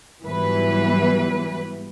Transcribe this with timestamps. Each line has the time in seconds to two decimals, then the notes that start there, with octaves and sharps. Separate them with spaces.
0.23 G#2 E3 F#3 G3 B3 B4